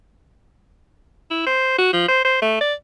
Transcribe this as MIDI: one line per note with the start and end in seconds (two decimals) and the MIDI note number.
1.31 1.46 64
1.46 1.78 72
1.78 1.90 66
1.93 2.04 53
2.08 2.21 72
2.25 2.41 72
2.42 2.58 57
2.61 2.74 74